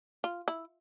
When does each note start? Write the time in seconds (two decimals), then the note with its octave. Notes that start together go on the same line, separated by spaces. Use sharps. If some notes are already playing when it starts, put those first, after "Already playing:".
0.24 F4
0.48 E4